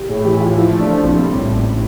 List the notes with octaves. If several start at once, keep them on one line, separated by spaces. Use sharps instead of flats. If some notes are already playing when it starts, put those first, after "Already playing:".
Already playing: G4
A2 G#4
E3 G4
A2 F4
F3 E4
A3
D4
F3
A#1 C4
G3
A2
A1